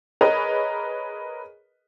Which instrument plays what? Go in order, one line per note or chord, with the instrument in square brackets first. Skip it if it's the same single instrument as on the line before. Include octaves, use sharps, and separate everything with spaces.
[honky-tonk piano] G#4 A#4 B4 C#5 D#5